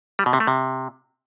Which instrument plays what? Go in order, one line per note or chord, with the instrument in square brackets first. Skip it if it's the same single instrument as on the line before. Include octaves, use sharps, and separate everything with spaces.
[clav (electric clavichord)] G3
B2
C3
A3
C3